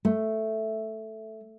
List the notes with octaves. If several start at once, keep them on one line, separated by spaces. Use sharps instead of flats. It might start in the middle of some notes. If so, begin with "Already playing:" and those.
A3